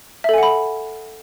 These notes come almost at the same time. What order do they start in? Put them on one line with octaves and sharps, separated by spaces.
E5 A4 G#5 F#5 B5